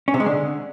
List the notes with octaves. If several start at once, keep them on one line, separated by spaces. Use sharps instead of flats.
C#4
C3
G#3
D3